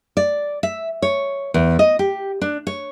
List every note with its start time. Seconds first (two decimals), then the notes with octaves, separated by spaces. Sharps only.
0.17 D5
0.63 E5
1.02 C#5
1.54 E2
1.79 D#5
1.99 G4
2.41 D4
2.67 C#5